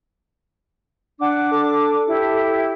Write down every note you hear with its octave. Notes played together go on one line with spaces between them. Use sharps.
D4 F#5 D6
A4
E4 G4